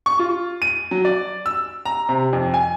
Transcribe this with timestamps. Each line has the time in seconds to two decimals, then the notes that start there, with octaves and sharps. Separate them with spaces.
0.06 C#6
0.19 F4
0.62 D#7
0.91 F#3
1.05 D5
1.46 E6
1.85 A#5
2.09 C3
2.33 F2
2.54 G#5